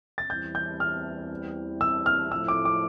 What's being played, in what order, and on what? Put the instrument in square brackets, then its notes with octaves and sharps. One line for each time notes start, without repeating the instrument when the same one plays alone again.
[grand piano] A6
[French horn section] E2 E3 G3 C4 E4 [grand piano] G6
[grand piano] G6
F6
E6
F6
[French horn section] A2 F3 A3 E4 [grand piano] E6
[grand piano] D6
D6